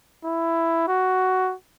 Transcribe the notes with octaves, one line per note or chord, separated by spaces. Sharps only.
E4
F#4